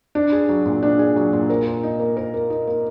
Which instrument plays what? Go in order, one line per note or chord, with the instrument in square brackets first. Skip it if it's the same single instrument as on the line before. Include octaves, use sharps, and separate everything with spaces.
[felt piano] D4
G#4
F#3
A#2
D4
G#4
F#3
A#2
A#4
A#3
D#4
A#3
A#4
A#3
D#4
A#3